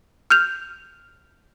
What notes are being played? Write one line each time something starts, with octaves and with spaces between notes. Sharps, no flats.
F6 G6 F7